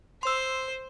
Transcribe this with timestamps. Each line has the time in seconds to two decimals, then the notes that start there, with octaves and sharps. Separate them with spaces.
0.23 C5 C6 E6